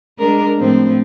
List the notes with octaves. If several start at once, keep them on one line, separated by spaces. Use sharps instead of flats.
G#3 D4 A#4
A2 F3 C4